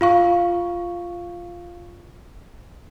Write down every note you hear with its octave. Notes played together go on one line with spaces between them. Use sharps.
F4 F5 C#6